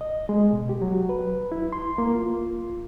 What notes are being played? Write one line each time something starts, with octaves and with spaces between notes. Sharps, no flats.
D#5
G#3
B2
G4
F#3
B4
E4
C6
A#3
F4